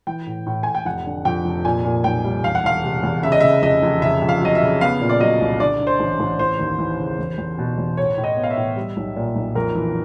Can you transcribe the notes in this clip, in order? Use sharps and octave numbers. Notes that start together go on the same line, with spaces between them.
E3 G5
A2
A2
A2 G#5
G5
F1 F#5
D3
F2 G5
F1
A#2 G#5
A#2
B1 G5
G3
E1 F5
F#5
E1 F5
C3
E2
C#3 E5
D#5
C#3 E5
F1 D#5
F1
C#3 E5
F2
F5
F#3 D#5
E5
C#3
B3 F5
A#2
D5
F#3 D#5
C2
D3 D5
D3
C5
A1
A1
E3 C5
D#2
E3
C#3
E2
E2
B2
E2
A2 C#5
A2
D#5
B3
F5
E5
A2
G3
B1
A#2
B1
F2 A#4
E3